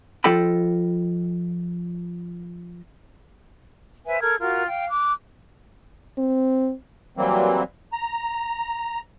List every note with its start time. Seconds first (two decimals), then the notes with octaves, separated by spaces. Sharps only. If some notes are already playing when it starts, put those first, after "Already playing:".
0.24 F3 F4 A4 D#5 G5 B5
4.06 B4 C5 E5 G#5
4.21 A4 A#4 F6 G#6
4.39 F4 F#4 A#4
4.66 F5 G5
4.88 D6 F#6
6.18 C4
7.17 E3 F#3 G3 A#3 C4
7.92 A#5